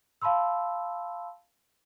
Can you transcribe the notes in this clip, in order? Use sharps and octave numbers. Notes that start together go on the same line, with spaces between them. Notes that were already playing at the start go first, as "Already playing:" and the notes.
F5 A5 B5 C6 E6